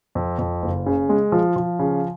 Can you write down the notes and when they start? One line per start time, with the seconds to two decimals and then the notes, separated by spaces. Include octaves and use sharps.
0.15 F2
0.38 F2
0.62 F#1
0.86 C#3
1.09 G#3
1.32 F3
1.56 F3
1.79 C#3